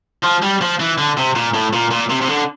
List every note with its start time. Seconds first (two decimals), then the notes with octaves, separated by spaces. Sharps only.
0.24 F3
0.43 G3
0.61 F3
0.80 E3
0.98 D3
1.17 C3
1.36 A#2
1.54 A2
1.73 A#2
1.91 A#2
2.10 C3
2.22 C3
2.29 D3